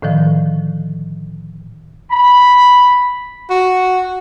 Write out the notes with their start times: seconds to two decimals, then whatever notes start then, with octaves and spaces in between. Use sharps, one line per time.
0.02 A2 D3 D#3 F3
2.11 B5
3.50 F#4